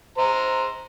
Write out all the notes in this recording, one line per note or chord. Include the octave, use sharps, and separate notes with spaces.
C5 A#5